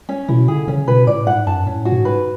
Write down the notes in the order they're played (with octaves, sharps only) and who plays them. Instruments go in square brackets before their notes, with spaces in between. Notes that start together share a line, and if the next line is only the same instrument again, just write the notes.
[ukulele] C#4
[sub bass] B2 [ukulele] E4
[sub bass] D3 [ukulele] G#4
[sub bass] C#3 [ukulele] C#4
[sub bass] B2 [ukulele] B4
[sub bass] A2 [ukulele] D5
[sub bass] G#2 [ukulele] F#5
[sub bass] F#2 [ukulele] A5
[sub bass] A2 [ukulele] C#4
[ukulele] F#4
[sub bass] G#2
[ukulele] B4